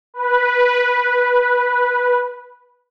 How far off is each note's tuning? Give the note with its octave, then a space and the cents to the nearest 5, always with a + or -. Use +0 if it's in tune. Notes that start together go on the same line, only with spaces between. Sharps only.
B4 -10